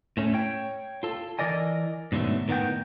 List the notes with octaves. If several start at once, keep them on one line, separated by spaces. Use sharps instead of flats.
A2 A3 C#4
C#5 G5
F4 A4
E3 A#4 D5 D#5 G#5
G#2 B2 D3 F#3 A3
A2 D#3 B3 F#5 G5